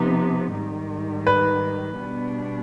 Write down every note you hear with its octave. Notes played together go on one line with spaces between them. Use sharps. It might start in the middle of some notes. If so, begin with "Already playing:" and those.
Already playing: C3 F3 B3 D#4
G#2 D#3 G3
B4
B2 G3 B3 D4